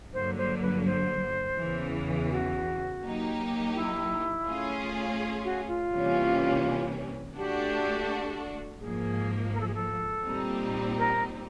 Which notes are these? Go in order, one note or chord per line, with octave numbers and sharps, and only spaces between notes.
G2 D3 F#3 A#3 C5
C5
B4
C5
E2 C#3 E3
F#4
F#3 A#3 D#4 G4
E4
A3 C#4 F4 G#4
F#4
F4
C3 E3 G3 A#3 C#4
A3 D4 F#4 G4 A4
G#2 F3 A#3 G#4
A#4
A4
G#4
A4
A#2 G3 C4 D#4
A#4